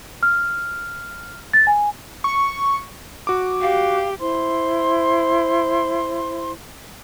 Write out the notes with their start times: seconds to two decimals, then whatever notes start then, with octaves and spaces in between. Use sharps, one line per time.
0.23 F6
1.53 A6
1.67 G#5
2.24 C#6
3.27 F#4 D6
3.62 G4 F5
4.19 E4 C5 C6